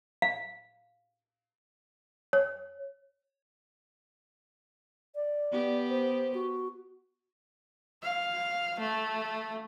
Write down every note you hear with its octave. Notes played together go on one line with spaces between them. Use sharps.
F5
C#5
D5
B3 G4
C5
F#4
F5
A3